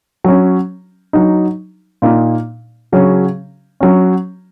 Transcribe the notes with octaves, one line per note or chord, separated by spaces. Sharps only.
F#3 C#4
F#3 D#4
A#2 A#3 D#4
C#3 F#3 C#4
F#3 C#4